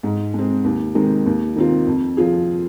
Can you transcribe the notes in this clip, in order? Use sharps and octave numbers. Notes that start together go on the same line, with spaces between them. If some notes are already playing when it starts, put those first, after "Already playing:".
G#2
G#3 C4
D#2
D#3 G#3 C4
D#2
D#3 C4 F4
F2
F3 C4 F4 G#4